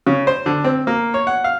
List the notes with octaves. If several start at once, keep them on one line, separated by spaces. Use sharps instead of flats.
C#3
C5
D3
C4
A#3
C#5
F#5
F5